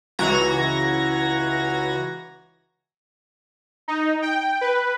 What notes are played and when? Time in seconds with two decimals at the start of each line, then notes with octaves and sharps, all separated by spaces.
0.19 C#2 E3 F#4 A#5 G#6 A#6
3.88 D#4
4.22 G5
4.61 B4